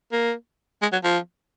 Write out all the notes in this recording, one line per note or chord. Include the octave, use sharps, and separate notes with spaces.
A#3
G#3
F#3
F3